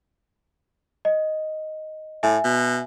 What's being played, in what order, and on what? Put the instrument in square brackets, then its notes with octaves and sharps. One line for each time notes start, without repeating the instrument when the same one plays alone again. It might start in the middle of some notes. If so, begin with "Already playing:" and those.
[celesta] D#5
[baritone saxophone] A2 [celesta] E5 G#5
[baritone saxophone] B2